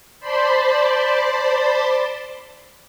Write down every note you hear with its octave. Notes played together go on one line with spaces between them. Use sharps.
C5 D5 A5 B5 C6